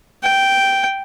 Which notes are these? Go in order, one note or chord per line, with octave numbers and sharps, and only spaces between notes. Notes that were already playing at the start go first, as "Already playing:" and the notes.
G5